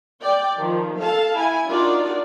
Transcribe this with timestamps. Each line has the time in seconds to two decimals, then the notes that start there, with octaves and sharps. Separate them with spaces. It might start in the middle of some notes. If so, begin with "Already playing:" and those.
0.21 D5 G5
0.58 D#3 F3
0.99 A4 F5 A5
1.35 E4 G#5
1.69 D4 D#4 F4 F#4 A#4 D5